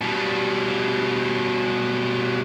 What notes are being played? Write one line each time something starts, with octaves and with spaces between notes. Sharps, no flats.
B2 G3